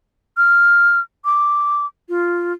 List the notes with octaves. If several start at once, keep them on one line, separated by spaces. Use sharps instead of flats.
F6
D6
F4